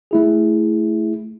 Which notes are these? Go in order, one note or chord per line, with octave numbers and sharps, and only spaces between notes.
A3 E4 G#4